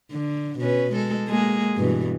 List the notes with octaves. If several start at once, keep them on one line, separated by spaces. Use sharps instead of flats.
D3
B2 C#4 B4
G#3 A4
G#3 A#3 G#4
G2 B2 E3